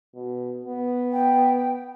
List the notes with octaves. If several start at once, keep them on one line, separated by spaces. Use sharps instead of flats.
B2
B3
G5